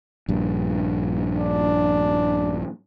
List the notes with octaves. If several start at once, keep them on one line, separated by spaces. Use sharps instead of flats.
A#1 G2
D4